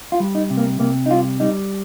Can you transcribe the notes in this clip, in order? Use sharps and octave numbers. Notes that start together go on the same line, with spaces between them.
F4
G3
D#4
C3
A#3
C3 A#3
D#4
G3 F4
G3 D#4